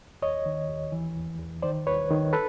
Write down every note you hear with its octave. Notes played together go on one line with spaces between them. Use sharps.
D#2 C#5 D#5
D#3
D#2
E3
E2
E2
D#3 C5 D5
D#2 B4 C#5
D#3
A4 B4